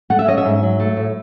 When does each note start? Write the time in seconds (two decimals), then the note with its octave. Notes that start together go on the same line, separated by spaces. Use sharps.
0.10 A3 F#5
0.19 E5
0.28 C#4 D#5
0.38 E5
0.45 G#2
0.63 F#3
0.80 A3
0.97 A2